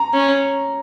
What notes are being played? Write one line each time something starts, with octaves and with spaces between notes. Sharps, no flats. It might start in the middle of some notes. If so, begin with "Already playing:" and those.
Already playing: A#5
C#4